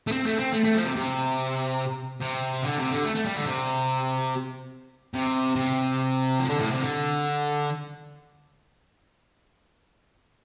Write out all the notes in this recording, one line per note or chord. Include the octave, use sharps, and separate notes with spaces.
A3
C4
A3
C4
A3
A3
F3
C3
C3
C3
D3
C3
D3
A3
A3
G3
D3
C3
C3
C3
F3
D3
A2
C3
D3